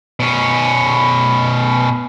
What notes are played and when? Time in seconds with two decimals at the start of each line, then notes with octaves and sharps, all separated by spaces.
0.20 B2 C#4